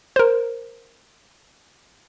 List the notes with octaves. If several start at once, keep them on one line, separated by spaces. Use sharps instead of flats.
A#4 C5